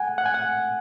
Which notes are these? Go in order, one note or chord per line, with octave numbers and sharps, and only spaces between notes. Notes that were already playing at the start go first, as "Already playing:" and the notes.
Already playing: F#5 G#5
F#5
G#5
F#5